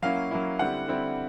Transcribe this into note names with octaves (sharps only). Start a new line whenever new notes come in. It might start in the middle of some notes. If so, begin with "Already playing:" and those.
F#3 A#3 C#4 E4 F5
F#3 A#3 C#4 E4
D3 G3 C4 E4 F#5
D3 G3 C4 E4